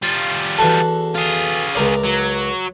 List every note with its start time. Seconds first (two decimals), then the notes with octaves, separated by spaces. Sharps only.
0.02 G3 F4
0.58 E2 F#4 A4
1.15 F4 G#4
1.75 C#2 A#4 D5
2.04 F#3